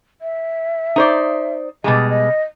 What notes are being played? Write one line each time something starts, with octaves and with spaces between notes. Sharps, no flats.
E5
D#4 C5 D5
B2 G3 G#3 D#5
D#5